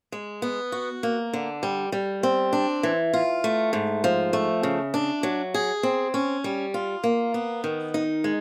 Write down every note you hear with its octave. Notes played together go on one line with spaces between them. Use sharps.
G#3
B3
F#4
A#3
D3
G3
G3
C4
D4
E3
F4
A3
G#2
F3
A3
C#3
D4
F#3
G#4
C4
C#4
G3
F4
A#3
B3
D#3
D#4
G#3